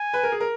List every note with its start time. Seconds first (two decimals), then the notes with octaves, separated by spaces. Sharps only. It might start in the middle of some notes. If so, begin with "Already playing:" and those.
Already playing: G#5
0.13 B4
0.23 A#4
0.32 G#4
0.40 A#4